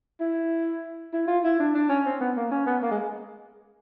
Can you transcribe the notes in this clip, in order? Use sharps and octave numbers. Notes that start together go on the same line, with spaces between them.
E4
E4
F4
E4
D4
D4
C#4
C4
B3
A#3
C#4
B3
A#3
G#3